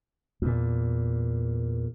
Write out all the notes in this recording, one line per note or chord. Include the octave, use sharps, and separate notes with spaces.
E2 A#2